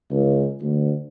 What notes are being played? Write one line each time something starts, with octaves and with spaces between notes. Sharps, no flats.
C#2
D2